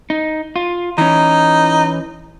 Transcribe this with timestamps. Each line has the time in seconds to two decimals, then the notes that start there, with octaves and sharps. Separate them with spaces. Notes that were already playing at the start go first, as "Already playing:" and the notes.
0.10 D#4
0.56 F4
0.98 E3 C#4 D#4